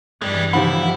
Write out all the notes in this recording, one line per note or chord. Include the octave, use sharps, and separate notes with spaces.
G2 E3 G3 G#3 D5
D#3 F3 E4 G4 C#5 F#5 B5